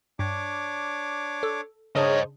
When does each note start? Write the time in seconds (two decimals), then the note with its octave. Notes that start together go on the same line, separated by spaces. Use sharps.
0.19 G2 D4 C#5 D6
1.43 A4
1.96 C#3 D4 D#4 G#4 A#4 C5 C#5 D#5